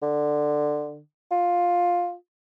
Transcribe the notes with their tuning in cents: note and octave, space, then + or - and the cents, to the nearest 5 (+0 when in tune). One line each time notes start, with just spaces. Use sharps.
D3 +15
F4 +10